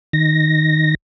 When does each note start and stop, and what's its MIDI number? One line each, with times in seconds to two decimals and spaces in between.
0.13 0.95 51
0.13 0.95 94